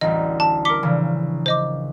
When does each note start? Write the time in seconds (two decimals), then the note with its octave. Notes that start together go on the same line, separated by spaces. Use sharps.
0.01 A1 D2 G3 D#5
0.40 A5
0.65 A#4 D6 B6 C#7 G7
0.83 A#1 C#3 E3
1.46 C5 D#5 D6